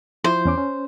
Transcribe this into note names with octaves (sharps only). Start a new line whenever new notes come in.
F3 E4 F4 C5
E2 C#4 D6
C#4